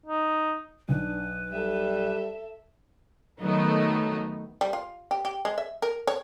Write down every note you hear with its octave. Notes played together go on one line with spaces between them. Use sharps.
D#4
B1 D4 B4
G3 A4 E5
D#3 F#3 A3 B3 D#4
G3
F4
G4
G4
G#3
E5
A#4
C#5